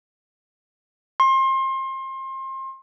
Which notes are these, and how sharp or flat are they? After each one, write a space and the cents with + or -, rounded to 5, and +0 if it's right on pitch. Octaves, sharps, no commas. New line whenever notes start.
C6 +30